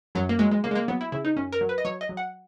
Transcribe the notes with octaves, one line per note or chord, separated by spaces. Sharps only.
F#2 F#3
A#3
F#3 G#3
G#3
C#3 A#3
G#3
A#3
F#3 B3
E4
C#3 E4
D#4
F#2 C#4
A#4
F#3
B4
D#5
F#3 C#5
D#5
F#3
F#5